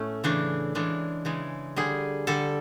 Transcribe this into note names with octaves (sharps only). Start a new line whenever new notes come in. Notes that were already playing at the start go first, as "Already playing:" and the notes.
Already playing: A2 A3 C#4
C#3 E3 A3 D4
C#3 E3 G#3 D4
C#3 E3 G#3
D3 G3 G#4
D3 G3 A4